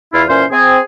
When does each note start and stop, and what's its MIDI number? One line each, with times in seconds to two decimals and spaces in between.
0.13 0.23 40
0.13 0.23 64
0.13 0.23 65
0.29 0.45 46
0.29 0.45 52
0.29 0.45 61
0.29 0.45 72
0.52 0.79 60
0.52 0.79 68